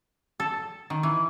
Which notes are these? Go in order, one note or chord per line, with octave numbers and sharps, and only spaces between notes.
A4
D#3
E3